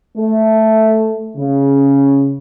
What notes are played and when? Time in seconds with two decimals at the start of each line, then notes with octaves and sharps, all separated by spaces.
0.18 A3
1.37 C#3